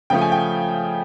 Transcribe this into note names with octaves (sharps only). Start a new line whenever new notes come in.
C#3 F3 A3 G5
G#5
G5